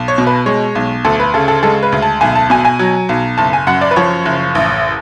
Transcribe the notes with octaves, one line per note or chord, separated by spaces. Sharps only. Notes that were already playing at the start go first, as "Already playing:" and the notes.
Already playing: B1
C#5
B2
B4
G#3 C#5
B1
D2 A4
B4
C#3 A4
A4
G#3 A4
B4
D2
A5
B1 G#5
A5
B2 G#5
G#5
F#3
B1
F#1 A5
G#5
F#2 F#5
D5
B4
F3 C#5
F#1
A1